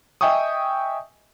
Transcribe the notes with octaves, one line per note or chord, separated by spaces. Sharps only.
D#5 E5 G5 G#5 C#6 D#6